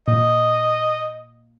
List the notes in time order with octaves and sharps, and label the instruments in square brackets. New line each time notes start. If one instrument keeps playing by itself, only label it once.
[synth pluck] A#2 [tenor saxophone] D#5